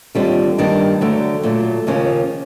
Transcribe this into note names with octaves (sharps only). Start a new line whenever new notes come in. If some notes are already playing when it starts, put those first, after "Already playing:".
D#2 D3 G3 C4 F4
G2 D#3 G3 A#3 D4
D2 D3 F#3 A3
A#2 F#3 A3
D#2 C#3 F3 A#3 C#4